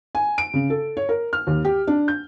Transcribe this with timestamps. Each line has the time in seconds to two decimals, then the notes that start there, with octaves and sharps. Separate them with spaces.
0.15 G#5
0.38 D7
0.54 C#3
0.70 A4
0.97 C#5
1.09 A#4
1.33 F6
1.47 D#2
1.65 G4
1.87 D4
2.08 G6